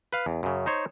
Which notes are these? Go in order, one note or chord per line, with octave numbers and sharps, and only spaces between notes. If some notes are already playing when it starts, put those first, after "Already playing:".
B4 F5
E2
F#2 C#3
D#4 C5 C#5